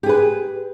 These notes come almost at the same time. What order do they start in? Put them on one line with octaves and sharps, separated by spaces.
G4 G#4 B4